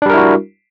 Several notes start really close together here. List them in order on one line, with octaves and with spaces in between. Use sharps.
D4 G3 A#4 E4 F#4